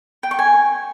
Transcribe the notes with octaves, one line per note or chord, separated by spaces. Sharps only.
G5
C#6
G#5